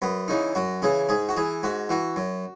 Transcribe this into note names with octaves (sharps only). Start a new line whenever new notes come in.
F#2 B3
C#3 E3 D#4
F#2 F#4
C#3 E3 G#4
G#2 G#4
F#4
E3 G#4
G#2 F#4
E3 F#4
F#2